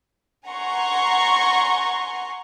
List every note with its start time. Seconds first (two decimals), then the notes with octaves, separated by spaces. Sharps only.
0.47 F#5 G#5 A#5 C6 C#6